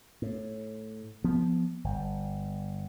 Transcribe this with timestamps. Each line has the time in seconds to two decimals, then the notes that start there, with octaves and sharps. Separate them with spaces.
0.22 A2
1.24 F3 B3
1.84 G1